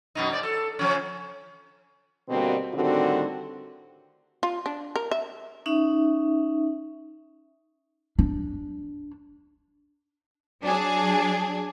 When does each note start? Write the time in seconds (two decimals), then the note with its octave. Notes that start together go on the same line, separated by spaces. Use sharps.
0.15 F#2 B2 D#4
0.31 G#2 D5
0.43 A4
0.79 C#3 F3 C#4
2.29 B2 D3 G3 A#3 C4 F#4
2.74 A2 D3 D#3 G3 C4 F#4
4.43 F4
4.66 D4
4.96 A#4
5.11 E5
5.66 C#4 D#4 E5
8.19 D4
10.63 F#3 D4 G#4